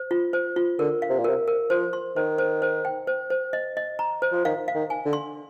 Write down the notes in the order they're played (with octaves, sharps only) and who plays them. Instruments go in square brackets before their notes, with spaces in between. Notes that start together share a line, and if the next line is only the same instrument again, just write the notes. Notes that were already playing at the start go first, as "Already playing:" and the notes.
Already playing: [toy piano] C5
F4
C5
F4
[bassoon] D3 [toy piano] A#4
[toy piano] F5
[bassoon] C3
A#2
[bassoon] C3 [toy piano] A#4
[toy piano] A#4
[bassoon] F3 [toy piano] C5
[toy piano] C6
[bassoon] D#3 [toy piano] C5
[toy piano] C5
C5
G5
C5
C5
D#5
D#5
A#5
C5
[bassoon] F3
[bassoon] D#3 [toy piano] F5
[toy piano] F5
[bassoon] D#3
[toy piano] G#5
[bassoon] D3
[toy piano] C6